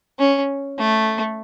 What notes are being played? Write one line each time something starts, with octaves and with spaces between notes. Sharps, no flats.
C#4
A3